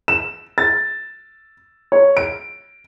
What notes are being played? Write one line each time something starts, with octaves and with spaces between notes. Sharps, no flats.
E7
A6
C#5
D7